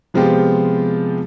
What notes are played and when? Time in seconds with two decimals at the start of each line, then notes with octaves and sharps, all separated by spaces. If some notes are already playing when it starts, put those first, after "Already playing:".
0.14 C3 F3 G#3 B3 F4 G4